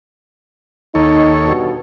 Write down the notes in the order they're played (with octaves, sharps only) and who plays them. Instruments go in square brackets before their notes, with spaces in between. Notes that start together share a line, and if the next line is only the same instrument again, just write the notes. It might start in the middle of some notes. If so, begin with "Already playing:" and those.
[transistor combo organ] D#2 A4 C#5 [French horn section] D#4
[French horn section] G2 B2